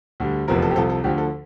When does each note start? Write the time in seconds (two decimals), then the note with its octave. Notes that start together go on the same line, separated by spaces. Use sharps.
0.20 D2 D3 G3
0.48 F1 E2 C3 F3 A#4
0.62 A4
0.71 G4
0.76 C2 C3 F3 A4
0.90 A4
1.04 D2 D3 F3 G4
1.18 A4